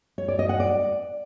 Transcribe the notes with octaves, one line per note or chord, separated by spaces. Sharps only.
C#5
D5
D#5
F#5
D5